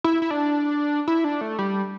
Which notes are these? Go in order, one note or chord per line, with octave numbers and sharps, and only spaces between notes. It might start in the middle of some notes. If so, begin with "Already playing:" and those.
E4
E4
D4
E4
D4
A3
G3